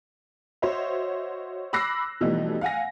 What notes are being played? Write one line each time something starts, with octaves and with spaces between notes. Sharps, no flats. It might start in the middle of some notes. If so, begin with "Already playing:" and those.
F#4 C5 C#5 D#5 E5
B5 D6 E6 F#6 A#6 C7
B2 E3 F3 G3 A3 D#4
F5 F#5 G#5 A#6